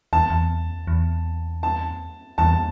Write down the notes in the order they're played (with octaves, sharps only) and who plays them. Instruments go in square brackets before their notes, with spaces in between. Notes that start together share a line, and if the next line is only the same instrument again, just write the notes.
[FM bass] E2 [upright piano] A5
[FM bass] E2
E2
[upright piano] A5
[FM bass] E2 [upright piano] A5